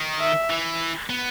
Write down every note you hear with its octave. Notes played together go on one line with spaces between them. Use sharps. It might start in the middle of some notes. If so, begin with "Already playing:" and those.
Already playing: D#3
E5
E3
B3